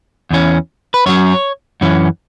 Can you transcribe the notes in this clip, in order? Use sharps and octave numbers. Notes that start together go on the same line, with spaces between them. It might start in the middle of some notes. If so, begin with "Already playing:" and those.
E2 E3 C#4
B4
F#2 F#3 C#4 C#5
F#2 E3 C#4